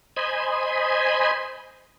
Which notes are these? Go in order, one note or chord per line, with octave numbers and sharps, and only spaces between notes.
C5 D#5 G#5 B5